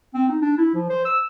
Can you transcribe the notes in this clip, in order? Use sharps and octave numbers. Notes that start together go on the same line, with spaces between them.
C4
D#4
D4
E4
F3
C5
E6